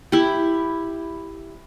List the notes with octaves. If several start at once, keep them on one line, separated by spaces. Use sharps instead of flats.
E4 G4